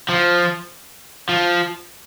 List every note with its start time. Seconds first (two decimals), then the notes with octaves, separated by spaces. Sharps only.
0.09 F3
1.29 F3